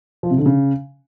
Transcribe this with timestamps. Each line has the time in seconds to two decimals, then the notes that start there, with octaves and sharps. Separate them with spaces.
0.23 F3
0.31 C3
0.38 D3
0.46 C#3